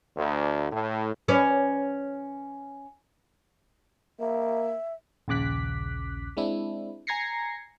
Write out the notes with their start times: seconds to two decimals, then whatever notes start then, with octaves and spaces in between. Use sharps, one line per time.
0.17 D2
0.71 A2
1.28 C#4 B4 D5
4.20 A#3 E5
5.28 A#1 D#2 C#3 D6 F#6 B6
6.37 G#3 C4 D4 E4
7.07 G#5 A#5 G#6 A#6 C7 C#7